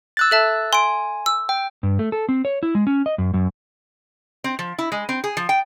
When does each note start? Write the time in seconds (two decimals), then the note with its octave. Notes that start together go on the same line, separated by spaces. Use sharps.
0.17 E6 F#6 A6
0.31 A4 E5 A5
0.73 G#5 C6 D7
1.26 E6
1.49 G5
1.83 G2
1.99 A3
2.12 A4
2.29 C4
2.45 C#5
2.63 E4
2.75 G#3
2.87 C#4
3.06 D#5
3.18 F#2
3.34 F#2
4.44 C4
4.59 F3
4.78 E4
4.92 G#3
5.09 C4
5.24 G#4
5.37 F3
5.49 G5